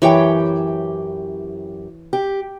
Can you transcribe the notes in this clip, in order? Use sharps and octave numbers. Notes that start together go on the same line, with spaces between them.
F#2 E3 G4 C#5 G5
G4